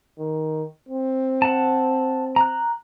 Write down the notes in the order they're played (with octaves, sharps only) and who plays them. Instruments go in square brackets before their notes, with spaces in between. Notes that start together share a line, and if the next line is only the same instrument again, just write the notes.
[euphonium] D#3
C4
[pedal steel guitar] F#5 A5
A#5 F#6